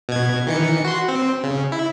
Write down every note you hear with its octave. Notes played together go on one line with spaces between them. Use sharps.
B2 G#6
D#3 E3 C#7
F#4 C6
C4
C#3
E4